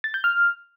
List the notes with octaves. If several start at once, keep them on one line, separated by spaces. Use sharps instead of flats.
A6
G6
F6